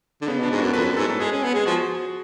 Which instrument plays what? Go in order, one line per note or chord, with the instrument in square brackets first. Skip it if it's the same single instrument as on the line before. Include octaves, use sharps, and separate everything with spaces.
[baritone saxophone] D3
[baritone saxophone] C#3 [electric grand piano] B3
[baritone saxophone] B2
[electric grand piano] D4
[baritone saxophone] G#2
[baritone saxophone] F#2 [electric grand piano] F#4
[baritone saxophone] F2 [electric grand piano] B4
[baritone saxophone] F#2
[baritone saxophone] G#2 [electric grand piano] A4
[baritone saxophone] A2
[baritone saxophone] G#3 [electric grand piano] G#4
[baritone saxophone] C#4
B3
[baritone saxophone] G#3 [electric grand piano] G#4
[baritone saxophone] F3 [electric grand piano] F#4